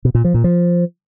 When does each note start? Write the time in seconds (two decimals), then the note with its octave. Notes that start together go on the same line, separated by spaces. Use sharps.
0.05 B2
0.15 A#2
0.24 F3
0.34 A#2
0.44 F3